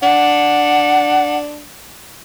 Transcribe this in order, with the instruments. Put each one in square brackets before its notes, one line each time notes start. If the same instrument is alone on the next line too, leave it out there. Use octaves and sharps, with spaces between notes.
[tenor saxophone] D4 [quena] F#5